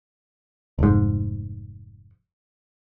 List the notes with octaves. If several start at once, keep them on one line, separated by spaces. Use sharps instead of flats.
F1 G#2